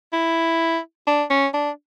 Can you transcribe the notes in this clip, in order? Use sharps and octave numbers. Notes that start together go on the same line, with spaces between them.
E4
D4
C#4
D4